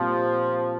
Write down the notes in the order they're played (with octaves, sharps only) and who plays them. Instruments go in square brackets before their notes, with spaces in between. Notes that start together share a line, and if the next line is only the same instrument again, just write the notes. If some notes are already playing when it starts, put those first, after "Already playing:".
Already playing: [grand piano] A#2 G3 C4 [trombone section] F3